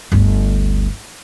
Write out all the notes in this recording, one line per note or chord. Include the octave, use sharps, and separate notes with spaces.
G1 D2